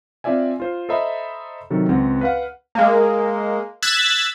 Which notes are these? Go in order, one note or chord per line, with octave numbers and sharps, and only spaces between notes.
C4 F4 D5 E5 G#5
F4 C5
A4 C5 D#5 E5 A#5 B5
C3 D#3 F#3 A4
C#2 C4 F#5
B4 F5 F#5
G#3 A#3
E6 F#6 G#6 A6 B6